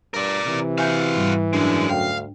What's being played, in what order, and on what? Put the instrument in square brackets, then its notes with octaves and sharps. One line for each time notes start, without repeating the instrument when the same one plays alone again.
[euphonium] G2 [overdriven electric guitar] A#4 D5
[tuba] C3 [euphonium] E3
[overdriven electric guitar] F#4 F5 [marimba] E5 G#5 G6
[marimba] G#2 G3
[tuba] F#2 [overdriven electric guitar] D3 G#3 [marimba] D4
[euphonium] D2 [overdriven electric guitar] F5 [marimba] G5